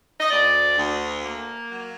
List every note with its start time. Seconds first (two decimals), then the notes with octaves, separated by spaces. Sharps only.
0.20 D#5
0.30 D2 D5
0.77 D2
1.25 A#3
1.71 F#3